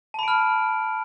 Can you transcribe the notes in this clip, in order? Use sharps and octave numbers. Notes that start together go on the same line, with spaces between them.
A5 B5 F6 D7